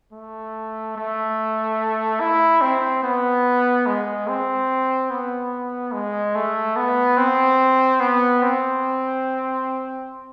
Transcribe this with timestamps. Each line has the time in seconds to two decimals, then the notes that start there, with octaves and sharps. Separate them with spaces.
0.13 A3
0.97 A3
2.21 E4
2.62 C4
3.03 B3
3.87 G#3
4.28 C4
5.10 B3
5.93 G#3
6.35 A3
6.76 B3
7.17 C4
8.00 B3
8.43 C4